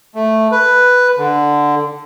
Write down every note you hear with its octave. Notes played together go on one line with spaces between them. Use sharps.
A3
B4
D3